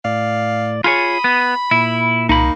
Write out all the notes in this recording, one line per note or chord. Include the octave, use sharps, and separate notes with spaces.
A2 D5 F5
F4 G#4 C#5 B5 D#6
B3
A#2 E4
C2 A#3 D#4 B5